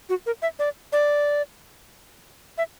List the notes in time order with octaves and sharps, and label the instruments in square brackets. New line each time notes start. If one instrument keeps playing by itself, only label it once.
[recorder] F#4
A#4
E5
D5
D5
E5